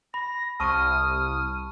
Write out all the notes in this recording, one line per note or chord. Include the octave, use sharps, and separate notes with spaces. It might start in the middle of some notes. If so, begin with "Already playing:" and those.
B5 A#6
C2 A5 C#6 D#6 F6 D#7